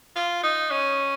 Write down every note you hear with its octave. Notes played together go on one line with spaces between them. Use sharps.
F4
D#4
C#4